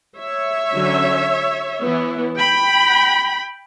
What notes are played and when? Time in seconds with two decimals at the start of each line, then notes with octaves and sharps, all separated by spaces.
0.17 C#5 E5
0.72 D3 F#3 C#4
1.83 E3 B3 E4
2.38 G5 B5